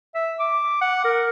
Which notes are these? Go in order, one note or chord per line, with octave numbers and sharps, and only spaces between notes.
E5
D6
F#5
A#4